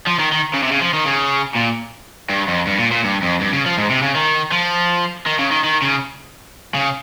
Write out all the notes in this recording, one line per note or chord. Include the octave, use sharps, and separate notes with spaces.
F3
D#3
D#3
C#3
C3
C#3
F3
D#3
C#3
A#2
G2
F2
G2
A#2
A#2
G2
F2
G2
C#3
F3
G#2
C3
C#3
D#3
F3
D#3
C#3
D#3
D#3
C#3
C#3